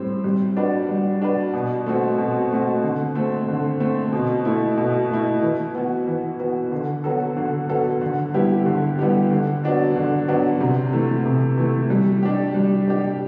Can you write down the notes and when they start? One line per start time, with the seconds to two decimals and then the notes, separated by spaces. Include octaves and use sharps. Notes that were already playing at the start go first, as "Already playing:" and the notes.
Already playing: A2 G3 C4
0.24 G3
0.57 D4 F#4 B4
0.89 G3
1.22 D4 F#4 B4
1.54 B2
1.86 A3 C4 F#4
2.18 B2
2.51 A3 C4 F#4
2.84 D3
3.15 A3 C4
3.48 D3
3.80 A3 C4
4.13 B2
4.45 A3 E4
4.78 B2
5.10 A3 E4
5.42 E3
5.75 B3 F#4
6.07 E3
6.40 B3 F#4
6.72 D3
7.04 F#3 B3 F#4 A4
7.37 D3
7.69 F#3 B3 F#4 A4
8.01 D3
8.34 G3 B3 E4 G4
8.66 D3
8.99 G3 B3 E4 G4
9.31 D3
9.64 F#3 B3 D4 F#4
9.96 D3
10.28 F#3 B3 D4 F#4
10.61 C3
10.93 E3 A3
11.26 C3
11.58 E3 A3
11.90 G3
12.23 D4 G4
12.54 G3
12.87 D4 G4